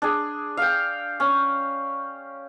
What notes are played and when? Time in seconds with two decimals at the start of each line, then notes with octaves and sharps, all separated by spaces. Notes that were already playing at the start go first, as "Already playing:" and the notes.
0.02 D4 G#4
0.57 F5 G5
1.20 C#4